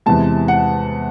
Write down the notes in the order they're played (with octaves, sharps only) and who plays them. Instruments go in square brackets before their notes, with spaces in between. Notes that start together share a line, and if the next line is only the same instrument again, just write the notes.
[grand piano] E2 C3 E3 G#3 A5
F#5